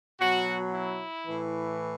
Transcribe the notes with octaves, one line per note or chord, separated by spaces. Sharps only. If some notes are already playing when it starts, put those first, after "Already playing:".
B2 F#3 F#4
E4
A2 E3